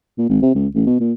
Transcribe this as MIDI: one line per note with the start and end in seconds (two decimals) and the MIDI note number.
0.18 0.26 46
0.29 0.41 32
0.42 0.52 48
0.55 0.67 37
0.74 0.85 33
0.87 0.99 47
1.00 1.13 46